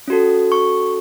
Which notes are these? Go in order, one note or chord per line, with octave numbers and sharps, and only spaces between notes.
C#4 F#4 A4
C#6